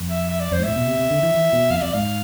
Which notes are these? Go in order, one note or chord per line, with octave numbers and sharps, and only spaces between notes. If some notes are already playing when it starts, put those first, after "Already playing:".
Already playing: F2
E5
E5
D5
F2 C5
G#2
A2 E5
B2
C3
C3
D3
E3
E3
B2
F2 F5
E5
F2 D5
G#2 F5